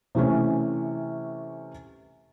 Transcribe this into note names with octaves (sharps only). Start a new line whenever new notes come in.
C3 E3 A3 C#4